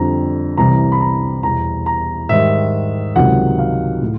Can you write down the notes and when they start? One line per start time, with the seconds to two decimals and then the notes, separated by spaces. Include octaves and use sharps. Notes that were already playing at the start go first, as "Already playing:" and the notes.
Already playing: F2 D3 G3 A#5
0.57 C2 C3 E3 G3 A#5
0.92 B5
1.00 A#5
1.43 E2 B2 G3 A#5
1.86 A#5
2.29 G#2 D#3 G3 E5
3.16 C#2 C3 D#3 F#3 F#5
3.59 F5
4.02 A2